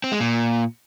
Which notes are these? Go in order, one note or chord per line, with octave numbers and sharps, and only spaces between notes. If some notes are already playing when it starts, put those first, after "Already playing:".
C4
G#3
A#2